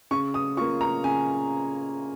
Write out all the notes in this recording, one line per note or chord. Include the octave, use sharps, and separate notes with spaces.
C#3 C#6
D#6
A#3 F4 C#6
A#5
C#3 G#5